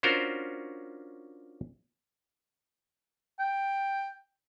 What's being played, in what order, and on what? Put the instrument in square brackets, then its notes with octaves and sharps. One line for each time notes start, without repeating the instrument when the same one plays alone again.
[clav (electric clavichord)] C#4 D4 F4 F#4 A#4 C5
[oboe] G5